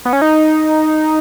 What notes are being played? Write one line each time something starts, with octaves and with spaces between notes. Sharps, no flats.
B3
C#4
D#4